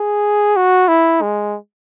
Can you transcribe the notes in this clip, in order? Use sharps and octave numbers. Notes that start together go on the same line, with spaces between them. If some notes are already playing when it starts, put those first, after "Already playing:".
Already playing: G#4
F#4
E4
G#3